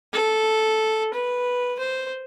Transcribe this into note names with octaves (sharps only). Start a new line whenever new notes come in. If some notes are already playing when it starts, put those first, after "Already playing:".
A4
B4
C5